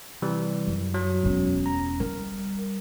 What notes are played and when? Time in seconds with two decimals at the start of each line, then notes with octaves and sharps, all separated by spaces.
0.22 C3 E3 G3
0.68 F#2
0.94 F#3
1.23 E1 C#4
1.66 A#5
2.00 G3 A#4